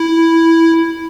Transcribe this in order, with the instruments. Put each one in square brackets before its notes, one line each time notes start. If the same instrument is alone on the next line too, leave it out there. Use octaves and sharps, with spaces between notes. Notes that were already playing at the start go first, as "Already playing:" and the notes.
Already playing: [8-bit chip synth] E4